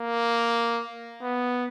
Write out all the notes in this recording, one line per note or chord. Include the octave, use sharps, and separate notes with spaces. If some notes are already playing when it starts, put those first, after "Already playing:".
Already playing: A#3
B3